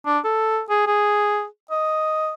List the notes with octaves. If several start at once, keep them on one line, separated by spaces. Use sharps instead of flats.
D4
A4
G#4
G#4
D#5